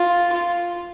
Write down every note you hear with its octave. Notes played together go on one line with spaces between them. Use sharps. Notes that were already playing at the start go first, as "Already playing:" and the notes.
Already playing: F4
F4